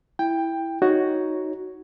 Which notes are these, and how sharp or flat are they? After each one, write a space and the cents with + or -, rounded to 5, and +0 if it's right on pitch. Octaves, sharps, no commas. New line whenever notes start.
E4 +0 G5 +10
D#4 +5 F#4 +0 C#5 +0